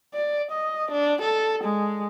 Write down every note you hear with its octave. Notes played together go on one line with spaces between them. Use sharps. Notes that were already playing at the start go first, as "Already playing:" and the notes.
D5
D#5
D4
A4
G#3